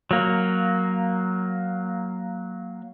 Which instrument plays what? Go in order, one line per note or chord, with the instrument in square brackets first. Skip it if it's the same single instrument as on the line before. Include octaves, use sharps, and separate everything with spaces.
[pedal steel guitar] F#3 A#3